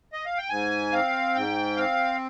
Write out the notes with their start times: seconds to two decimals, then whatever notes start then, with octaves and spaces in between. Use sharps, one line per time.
0.13 D#5
0.26 F5
0.38 G5
0.50 G#2 G#5
0.92 C4 F5
1.35 G#2 G5
1.77 C4 F5